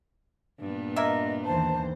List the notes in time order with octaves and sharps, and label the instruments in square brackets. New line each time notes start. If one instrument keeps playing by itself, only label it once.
[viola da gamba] G2 A#2 B3
[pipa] A#3 A#4 E5 [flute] D#5
[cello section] D#2 E3 C5 [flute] A5